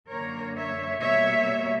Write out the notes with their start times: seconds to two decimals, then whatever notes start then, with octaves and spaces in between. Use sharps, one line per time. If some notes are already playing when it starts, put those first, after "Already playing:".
0.10 F#2 D3 A#3 A#4 C#5
0.56 C#5 E5
1.02 B2 G3 A#3 C#5 E5